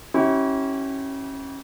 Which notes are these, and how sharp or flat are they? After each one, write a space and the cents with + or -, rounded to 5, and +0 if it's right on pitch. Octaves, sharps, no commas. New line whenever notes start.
C#4 -20 E4 -35 G4 -40